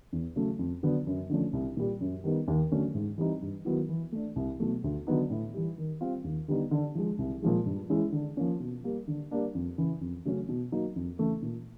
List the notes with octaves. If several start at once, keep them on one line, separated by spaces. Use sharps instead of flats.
E2
C#3 F#3 A3
F2
D3 F#3 B3 D4
F#2
D3 F3 A3 C#4
C2
A#2 G3
F#2
D#3 G3 B3 D#4
D#2
D3 F#3 A3 C#4
G#2
E3 G3 C4 D#4
G2
D#3 F#3 B3 E4
E3
A3 D4
C2
B2 F#3 A3
D2
D3 F#3 B3 D#4
A2
E3 G3
D#3
G3 C4 F4
D#2
D3 G3 B3 D#4
D3
F3 G#3
C2
A#2 F3 G#3
G2
E3 G#3 C#4 E4
D3
F3 A#3 C#4
B2
G3 A#3
D3
G3 A#3 D4
F2
C#3 E3
F2
C#3 F#3 A3 C#4
B2
F#3 A#3 D#4
F2
C#3 E3 A3
A#2